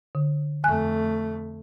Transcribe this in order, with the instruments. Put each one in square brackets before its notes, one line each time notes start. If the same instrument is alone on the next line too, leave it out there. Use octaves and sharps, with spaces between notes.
[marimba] D3
[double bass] F2 A3 [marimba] G#5 F#6